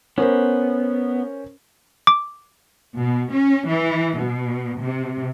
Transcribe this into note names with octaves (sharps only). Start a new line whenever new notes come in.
B3 C#4 A#4 C5
D6
B2
C#4
E3
B2
C3